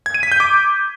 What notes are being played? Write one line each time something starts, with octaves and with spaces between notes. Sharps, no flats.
G#6
D#7
B6
G6
D6